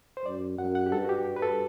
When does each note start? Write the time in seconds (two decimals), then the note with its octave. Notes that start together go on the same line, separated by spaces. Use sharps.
0.17 C5
0.25 F#2 D5
0.58 F#2 F#5
0.75 F#5
0.86 G4
0.92 G2 A4
1.04 F#4
1.09 G4
1.36 B4
1.42 A4